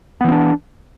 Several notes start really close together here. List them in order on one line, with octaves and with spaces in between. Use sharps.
B3 E3 C4 D4